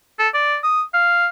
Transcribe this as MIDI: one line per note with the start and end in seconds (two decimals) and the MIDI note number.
0.19 0.28 69
0.34 0.57 74
0.64 0.82 87
0.94 1.27 77